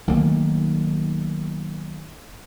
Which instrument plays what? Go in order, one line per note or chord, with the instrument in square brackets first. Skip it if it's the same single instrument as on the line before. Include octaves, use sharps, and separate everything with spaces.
[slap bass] B1 D#3 A3 A#3